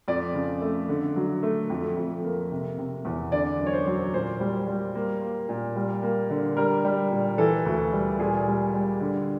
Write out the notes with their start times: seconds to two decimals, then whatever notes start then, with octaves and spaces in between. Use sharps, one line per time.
0.08 F2 D5
0.34 C#3
0.62 A3
0.89 D3
1.16 F#3
1.43 A3
1.70 F2
1.97 F2
2.24 A#3
2.52 C3
2.78 C3
3.05 E2
3.32 D3 D5
3.60 F#2
3.66 C#5
3.73 C5
3.87 F#3
4.14 A#2 C5
4.40 G3
4.68 G3
4.95 A#3
5.21 A#3
5.49 A#2
5.76 G3
6.03 A#3
6.30 D3
6.57 G3 A#4
6.85 G3
7.11 A#2
7.38 E3 A4
7.66 D2
7.93 G3
8.19 A#2 G#4
8.47 G3
8.74 G3
9.00 D3